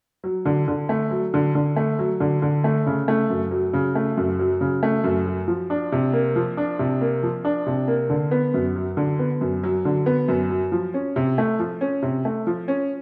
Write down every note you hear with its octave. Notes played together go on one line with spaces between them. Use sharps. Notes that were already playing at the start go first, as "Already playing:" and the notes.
F#3
D3
D3
A3
F#3
D3
D3
A3
F#3
D3
D3
A3
C#3
A3
F#2
F#3
C#3
A3
F#2
F#3
C#3
A3
F#2
F#3
F3
D4
C3
A#3
F3
D4
C3
A#3
F3
D4
C3
A#3
D3
B3
F#2
F#3
D3
B3
F#2
F#3
D3
B3
F#2
F#3
F3
C#4
C3
A3
F3
C#4
C3
A3
F3
C#4